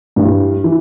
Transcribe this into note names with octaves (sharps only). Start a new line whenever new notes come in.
G2 E3 G3
E3